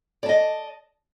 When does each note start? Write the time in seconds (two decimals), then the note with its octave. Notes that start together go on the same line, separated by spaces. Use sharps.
0.23 D5
0.26 A5
0.29 D#5